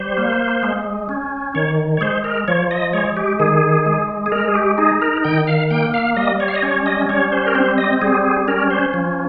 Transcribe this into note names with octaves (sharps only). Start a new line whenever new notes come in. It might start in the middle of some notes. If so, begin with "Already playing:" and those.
Already playing: G3 C5
A#3
G#3
C#4
D#3 C#5
C#5
G#3 C5
A#4
F3 C#5
D#5
G#3 C#5
G4
D#3 G#4
G#3
G#4
G#3 A#4
G#4
G4
D#4 G#4
A#4
D#3 G5
F5
A#3 G5
F5
G3 D#5
C#5
F5
D#5
C#4 C#5
D#5
G3 C#5
C5
A#4
C4 C5
D#5
G3 G#4
G#4
C#4 A#4
C5
F3